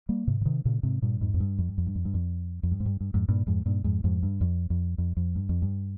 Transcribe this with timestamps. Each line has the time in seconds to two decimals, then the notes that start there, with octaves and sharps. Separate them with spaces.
0.09 G3 A#3
0.27 G#2 C3
0.41 C#3
0.45 C3 D#3
0.65 A#2 C#3
0.83 G#2 C3
1.02 G2 A#2
1.21 F2 G#2
1.34 F2
1.40 G2
1.58 F2
1.69 G2
1.78 F2
1.87 G2
1.95 F2
2.05 G2
2.14 F2
2.63 F2
2.71 G2
2.80 G#2
2.86 G2
3.01 G2
3.14 F2 G#2
3.28 G2 A#2
3.47 F2 G#2
3.66 G2 A#2
3.84 F2 G#2
4.04 F2 G#2
4.23 G2
4.41 F2
4.70 F2
4.98 F2
5.17 F2
5.35 G2
5.49 F2
5.62 G2